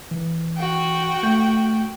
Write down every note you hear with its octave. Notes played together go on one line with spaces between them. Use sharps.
E3
F#4 G5
A3 G6